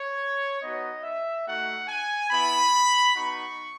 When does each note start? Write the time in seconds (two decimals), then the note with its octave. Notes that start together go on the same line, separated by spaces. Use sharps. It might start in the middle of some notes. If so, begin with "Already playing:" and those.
Already playing: C#5
0.61 B3 D#4 F#4 D#5
1.03 E5
1.46 A3 D#4 F#4 F#5
1.88 G#5
2.31 B3 E4 B5
3.15 B3 D#4 F#4 C#6